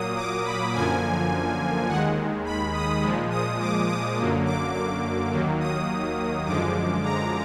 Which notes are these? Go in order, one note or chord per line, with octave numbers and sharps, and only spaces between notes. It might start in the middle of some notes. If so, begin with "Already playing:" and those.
Already playing: A#2 F#3 A#3 D#6
D6
B5
F#2 D3 F3 A#3 G#5
D#2 D#3 G#3 F#5
B5
D#6
A#2 F3 G#3
D#6
D6
D#6
F#2 D3 F#3 A#3
D6
D6
D#2 D#3 F#3 A#3
D#6
F#2 D3 F3 G#3 D6
A#5